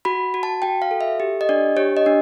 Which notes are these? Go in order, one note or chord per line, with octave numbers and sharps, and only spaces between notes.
F#4 B5
F#4
A5
F#4 G5
F5
A4
E5
G4
D#5
D4 D5
G4 C#5
D#5
D4